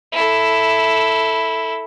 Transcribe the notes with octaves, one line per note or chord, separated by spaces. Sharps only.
E4 A4